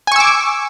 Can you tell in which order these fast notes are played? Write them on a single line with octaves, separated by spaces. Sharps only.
G#5 C#6 E6 D6